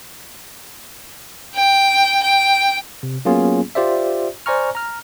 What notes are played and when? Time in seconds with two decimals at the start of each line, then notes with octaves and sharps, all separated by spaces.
1.55 G5
2.23 G5
3.03 C3
3.25 F#3 A#3 B3 C#4 F4 G#4
3.75 F4 G4 C5 D5 E5
4.46 C5 D5 G#5 A#5 C#6 F6
4.75 A#5 F6